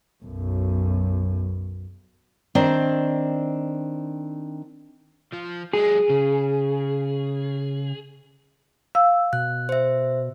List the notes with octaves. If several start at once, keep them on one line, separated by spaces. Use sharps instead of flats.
B1 F#2
D#3 C4 D4 C5 D5
F3
F#3 G#3 G#4
C#3
F5 E6
B2 F#6
C5 E5